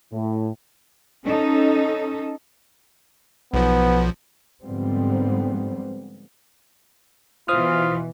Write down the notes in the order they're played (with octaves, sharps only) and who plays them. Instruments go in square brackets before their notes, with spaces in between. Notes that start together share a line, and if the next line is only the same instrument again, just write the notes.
[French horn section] A2
[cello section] C#4 D#4 A4
[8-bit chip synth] B1 F3 [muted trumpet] B3
[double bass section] G#2 D3 F3 G3 B3 C4
[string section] B2 E3 [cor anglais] F4 [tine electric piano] C5 D#6 F6